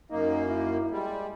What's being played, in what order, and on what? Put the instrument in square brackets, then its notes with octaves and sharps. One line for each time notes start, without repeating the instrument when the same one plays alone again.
[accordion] F#2 A#3 [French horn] D#4
[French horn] E4
[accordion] G3 [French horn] G#3